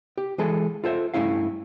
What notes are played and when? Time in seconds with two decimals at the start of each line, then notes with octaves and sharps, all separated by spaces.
0.18 G4
0.38 E3 G#3 G#4 A4 G#5
0.84 F4 A4 C5 E5
1.14 G2 D3 A3 C#4 E4 F5